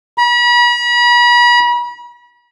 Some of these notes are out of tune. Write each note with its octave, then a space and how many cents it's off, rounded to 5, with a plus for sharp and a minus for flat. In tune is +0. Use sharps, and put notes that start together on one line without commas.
B5 -40